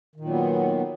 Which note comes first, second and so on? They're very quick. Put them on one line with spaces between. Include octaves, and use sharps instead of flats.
D#3 A#2 F#3 B3